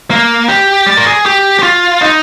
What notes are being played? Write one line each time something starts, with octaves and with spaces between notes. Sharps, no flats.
A#3
G4
D5
A#4
G#4
G4
G4
F4
D#4